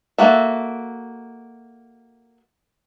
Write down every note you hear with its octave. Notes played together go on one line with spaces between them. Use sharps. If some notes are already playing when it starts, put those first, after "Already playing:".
A#3 F#4 A4 E5